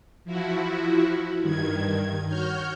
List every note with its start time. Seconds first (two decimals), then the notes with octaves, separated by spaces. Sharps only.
0.25 F3 E4 F#4
1.41 G2 D#3 G#6
2.27 F#4 C#5 F6 G6